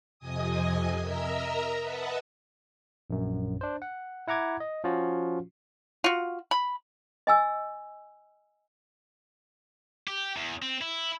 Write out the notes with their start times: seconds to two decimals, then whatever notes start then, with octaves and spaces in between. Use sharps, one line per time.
0.19 F2 C3 D#5 G#5 D#6
1.01 A#4 D#5 E5 A#5 E6
1.81 B4 D#5 E5 F#5 A5
3.10 A#1 F#2
3.61 D4 C5
3.82 F#5
4.28 E4 F#5 A#5 D6 G#6
4.60 D#5
4.84 F3 C#4 F4 F#4
6.04 F4 F#4
6.51 B5
7.27 D#5 G#5 E6
10.07 G4
10.36 E2
10.62 C4
10.81 E4